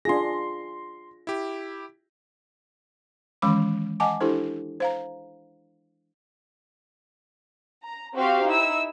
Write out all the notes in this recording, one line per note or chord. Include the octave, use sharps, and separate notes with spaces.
D4 F4 G#4 C6 A#6
E4 G4
D#3 E3 G#3 C#4 B5 D6
D#5 F#5 G#5 A5 D6
D4 E4 G4 A4 C5
C5 F5 A#5
A#5
C4 F#4 G4 C5 F5
D#4 E4 E6